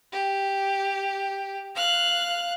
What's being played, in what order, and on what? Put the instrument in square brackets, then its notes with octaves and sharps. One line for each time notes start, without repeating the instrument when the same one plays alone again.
[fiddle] G4
F5 F#6